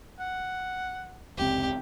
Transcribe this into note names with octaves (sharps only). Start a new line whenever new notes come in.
F#5
F1 C#2 C4 G4